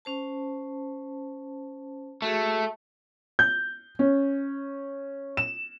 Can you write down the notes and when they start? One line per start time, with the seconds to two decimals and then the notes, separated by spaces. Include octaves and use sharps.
0.05 C#4 C5 A5
2.22 A3 F#4 G#4
3.39 G6
3.99 C#4
5.37 E7